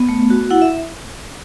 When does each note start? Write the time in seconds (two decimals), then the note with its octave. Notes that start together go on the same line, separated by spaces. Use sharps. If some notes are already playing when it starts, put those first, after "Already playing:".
Already playing: B3
0.09 A3
0.30 F#4
0.50 E4 F#5
0.62 E5